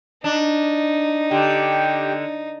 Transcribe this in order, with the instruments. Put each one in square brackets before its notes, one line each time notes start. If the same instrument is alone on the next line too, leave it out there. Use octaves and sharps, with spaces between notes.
[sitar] D4 [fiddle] D#4
[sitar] D3 [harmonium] G4 G5